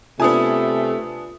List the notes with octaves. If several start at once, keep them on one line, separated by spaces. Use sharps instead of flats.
C3 A3 B3 D4 F4 G#5 D#6